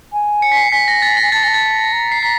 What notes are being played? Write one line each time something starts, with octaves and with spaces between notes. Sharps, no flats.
G#5
C#7
B6
C7
G#5 B6
A#6
A6
A#6
G#5
A5 A6
G#5 A5 A#6
A6
A#5
C7
A#5 B6